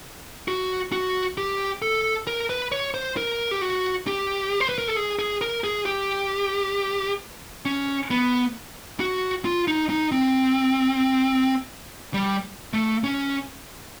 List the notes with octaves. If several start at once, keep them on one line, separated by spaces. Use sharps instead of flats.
F#4
F#4
G4
A4
A#4
B4
C#5
C5
A#4
G4
F#4
G4
C5
B4
A#4
A4
G#4
G#4
A#4
G#4
G4
C#4
B3
F#4
F4
D#4
D#4
C4
G3
A3
C#4